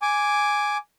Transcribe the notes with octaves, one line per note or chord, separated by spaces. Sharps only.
G#5 D6